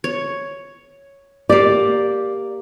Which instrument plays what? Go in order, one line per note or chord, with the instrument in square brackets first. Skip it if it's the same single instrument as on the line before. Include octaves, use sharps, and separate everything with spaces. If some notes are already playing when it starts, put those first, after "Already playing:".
[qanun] C#5
[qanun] A#3 G4 [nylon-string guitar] D5